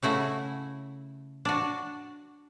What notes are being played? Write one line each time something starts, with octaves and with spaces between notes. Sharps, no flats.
C#3 A3 E4 F#4 F#5
D4 F#4